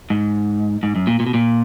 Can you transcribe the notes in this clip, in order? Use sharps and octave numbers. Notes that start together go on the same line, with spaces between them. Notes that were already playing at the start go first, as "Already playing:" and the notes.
G#2
G#2
F#2
A#2
A#2
B2
A#2